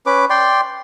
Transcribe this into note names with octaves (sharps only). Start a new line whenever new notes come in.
C#4 B4 D6
D5 G5 C6